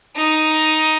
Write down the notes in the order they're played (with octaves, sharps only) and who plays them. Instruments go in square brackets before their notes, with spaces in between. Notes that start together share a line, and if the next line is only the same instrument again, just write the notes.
[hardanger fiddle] D#4